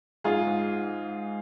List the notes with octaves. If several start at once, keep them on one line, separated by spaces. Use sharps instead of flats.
G#2 F4 G#4
G#2